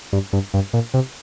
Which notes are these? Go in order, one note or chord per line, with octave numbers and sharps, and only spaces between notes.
G2
G2
G2
A#2
C3